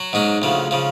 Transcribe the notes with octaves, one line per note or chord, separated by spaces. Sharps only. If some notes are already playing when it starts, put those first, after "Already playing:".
Already playing: F#3 F#4
G#2 G#3 C#4
D2 C#3 F3
C#3 F3